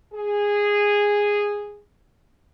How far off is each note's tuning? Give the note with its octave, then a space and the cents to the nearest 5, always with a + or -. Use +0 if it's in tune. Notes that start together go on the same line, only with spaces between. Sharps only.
G#4 -10